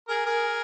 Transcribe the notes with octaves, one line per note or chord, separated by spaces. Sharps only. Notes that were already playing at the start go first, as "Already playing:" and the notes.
G#4 A#4
G#4 A#4